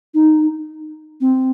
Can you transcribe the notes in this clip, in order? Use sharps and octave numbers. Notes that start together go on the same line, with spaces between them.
D#4
C4